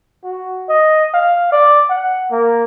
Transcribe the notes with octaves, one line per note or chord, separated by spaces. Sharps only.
F#4
D#5
F5
D5
F#5
A#3